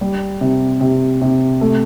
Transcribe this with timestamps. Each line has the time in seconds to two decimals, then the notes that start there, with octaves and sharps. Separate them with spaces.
0.01 G3
0.41 C3
0.81 C3
1.22 C3
1.61 A3